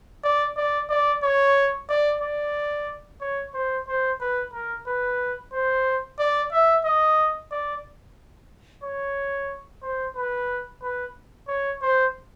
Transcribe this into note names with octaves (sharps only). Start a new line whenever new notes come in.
D5
D5
D5
C#5
D5
D5
C#5
C5
C5
B4
A#4
B4
C5
D5
E5
D#5
D5
C#5
C5
B4
B4
C#5
C5